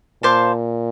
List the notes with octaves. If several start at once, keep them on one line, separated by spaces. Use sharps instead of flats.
A#2 C5 F5 A5 D6